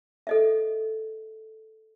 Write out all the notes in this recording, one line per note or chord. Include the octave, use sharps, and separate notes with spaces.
A4 D#5 E5